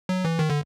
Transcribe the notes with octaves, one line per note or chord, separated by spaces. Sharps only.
F#3
E3
D#3
D3